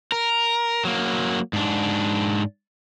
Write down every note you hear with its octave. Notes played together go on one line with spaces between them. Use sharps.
A#4
F#3 A#3
G#2 D4